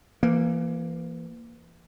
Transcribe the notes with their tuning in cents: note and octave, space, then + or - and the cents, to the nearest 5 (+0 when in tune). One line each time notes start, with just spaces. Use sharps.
E3 +30 A#3 +0